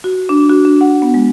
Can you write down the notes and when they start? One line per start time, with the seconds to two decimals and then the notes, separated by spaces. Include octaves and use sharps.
0.04 F#4
0.29 D4
0.50 F#4
0.65 D4
0.81 F#5
1.02 B3
1.14 G#3